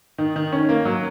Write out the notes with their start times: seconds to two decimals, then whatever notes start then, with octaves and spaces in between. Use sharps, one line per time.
0.18 D#3
0.36 D#3
0.52 C#4
0.69 A#3
0.85 F#3